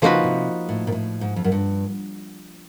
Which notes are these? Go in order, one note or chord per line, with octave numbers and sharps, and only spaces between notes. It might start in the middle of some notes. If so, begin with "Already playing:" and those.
C#3 F3 A#3 D#4 F#4 B4
C3
A2
A#2
A2
G#2
F2
F#2
G2